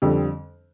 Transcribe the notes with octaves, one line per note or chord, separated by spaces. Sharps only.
F2 D3 G3